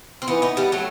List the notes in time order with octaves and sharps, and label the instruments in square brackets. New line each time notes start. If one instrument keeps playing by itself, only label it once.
[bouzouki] C4
[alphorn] E3 [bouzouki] B3 D#4
[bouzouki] B3 D#4
G3 B3
F#3 A3